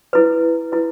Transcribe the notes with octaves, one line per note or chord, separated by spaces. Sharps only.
E4 B4
E4 B4